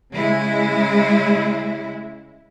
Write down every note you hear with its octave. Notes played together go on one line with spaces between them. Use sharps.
C#3 G#3 E4